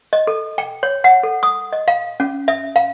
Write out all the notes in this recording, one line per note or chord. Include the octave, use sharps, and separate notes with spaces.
D#5
A4
G5
C#5
F#5
A4
D#6
D#5
F5
C#4
E5
F5